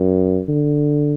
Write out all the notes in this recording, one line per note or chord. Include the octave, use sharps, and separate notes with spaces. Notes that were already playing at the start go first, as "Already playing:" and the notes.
Already playing: F#2
D3